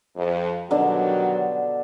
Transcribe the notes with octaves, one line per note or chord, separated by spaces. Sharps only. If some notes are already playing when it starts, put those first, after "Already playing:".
F2
B2 D3 D#3 F#3 G3 D4